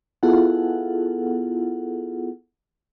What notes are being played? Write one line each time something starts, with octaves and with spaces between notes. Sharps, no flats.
B3 E4 F4 G#4 A4 F#5